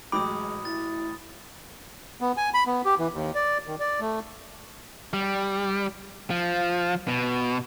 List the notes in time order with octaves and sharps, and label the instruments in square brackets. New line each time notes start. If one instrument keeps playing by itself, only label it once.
[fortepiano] A1 F#3 G5 [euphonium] G#3 [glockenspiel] B5 D#6 [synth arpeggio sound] D6
[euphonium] E4 [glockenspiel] A6
[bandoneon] B3
G#5
B5
B3
G4
E3
D#2
D5
D#3
D5
A3
[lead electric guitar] G3
F3
B2